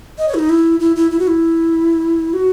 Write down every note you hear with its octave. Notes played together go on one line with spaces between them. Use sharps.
D#5
C#5
E4
D#4
E4
E4
E4
E4
F#4
E4
F#4